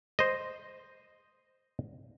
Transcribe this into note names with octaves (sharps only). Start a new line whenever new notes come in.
C5 D#5